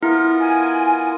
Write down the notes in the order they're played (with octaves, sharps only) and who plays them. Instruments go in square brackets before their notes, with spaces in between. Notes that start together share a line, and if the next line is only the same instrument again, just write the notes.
[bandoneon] B3 F4 A#4 [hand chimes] E4
[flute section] G#5